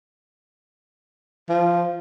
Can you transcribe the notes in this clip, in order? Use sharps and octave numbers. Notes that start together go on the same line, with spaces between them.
F3